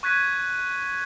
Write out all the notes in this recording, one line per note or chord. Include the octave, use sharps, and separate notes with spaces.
C#6 F#6 G#6 B6 D#7